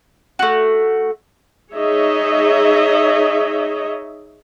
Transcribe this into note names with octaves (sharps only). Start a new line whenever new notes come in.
A3 F#4
D#4 G#4 C#5 D#5 E5